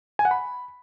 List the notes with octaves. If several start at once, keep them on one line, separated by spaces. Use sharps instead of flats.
G#5
F#5
B5